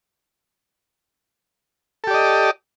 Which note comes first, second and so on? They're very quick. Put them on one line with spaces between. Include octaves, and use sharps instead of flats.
A4 G4 D5 D#5